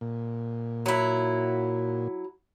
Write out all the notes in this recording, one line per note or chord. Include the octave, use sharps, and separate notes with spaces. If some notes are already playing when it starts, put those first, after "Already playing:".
A#2
F#3 E4